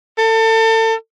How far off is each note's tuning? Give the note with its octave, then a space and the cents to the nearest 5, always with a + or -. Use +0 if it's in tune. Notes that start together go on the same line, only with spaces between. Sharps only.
A4 +30